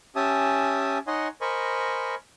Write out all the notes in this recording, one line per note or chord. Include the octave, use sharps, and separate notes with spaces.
C#4 G4 E5 G#5 A5 D#6
D#4 C#5 D#5 F#5 G#5 C6
A#4 C5 D#5 G#5 B5 C#6